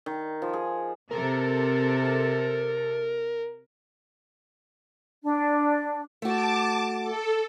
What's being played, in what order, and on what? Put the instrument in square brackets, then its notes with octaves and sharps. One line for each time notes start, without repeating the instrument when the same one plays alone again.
[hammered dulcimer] D#3
F3
G#4
[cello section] C3 A4 [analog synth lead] A#4
[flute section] D4
[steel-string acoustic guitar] A3 F#4 [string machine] A5 D6
[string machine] A4